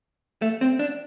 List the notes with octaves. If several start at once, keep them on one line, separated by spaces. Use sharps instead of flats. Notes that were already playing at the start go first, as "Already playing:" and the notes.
A3
C4
D4